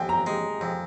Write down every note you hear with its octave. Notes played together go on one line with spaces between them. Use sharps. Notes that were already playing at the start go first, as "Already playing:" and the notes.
Already playing: F2 G5 G#5
A#5
G#3
F2